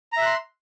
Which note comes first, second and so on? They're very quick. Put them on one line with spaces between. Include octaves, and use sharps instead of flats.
A#5 E5 F#6 C6